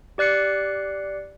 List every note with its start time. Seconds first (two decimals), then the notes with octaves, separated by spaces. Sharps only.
0.18 G4 D5 F#6 C7 C#7